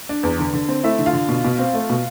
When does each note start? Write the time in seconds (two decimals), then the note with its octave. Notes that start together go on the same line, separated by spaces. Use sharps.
0.09 D4
0.23 E2
0.39 D3
0.53 D3
0.69 C4
0.83 A3 E4 E5
0.99 D3
1.06 F4 F5
1.13 D3
1.29 B2
1.45 B2
1.59 C4
1.74 A3
1.90 B2